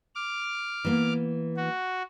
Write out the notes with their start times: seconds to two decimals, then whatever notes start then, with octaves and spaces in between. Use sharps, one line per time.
0.15 D6 F6
0.85 E3 A#3 B3
1.56 F#4